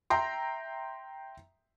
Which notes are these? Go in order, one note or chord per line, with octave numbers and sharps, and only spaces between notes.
E5 G5 A#5 C6